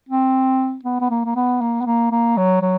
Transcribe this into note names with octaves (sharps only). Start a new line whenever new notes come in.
C4
B3
B3
A#3
A#3
B3
A#3
B3
A#3
A#3
F#3
F#3